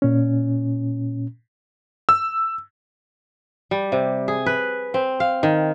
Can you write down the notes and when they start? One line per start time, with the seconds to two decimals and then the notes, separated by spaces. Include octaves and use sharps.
0.02 A#2 C#4
2.09 E6
3.71 G3
3.92 C3
4.28 G#4
4.46 B4
4.94 C4
5.20 F5
5.43 D#3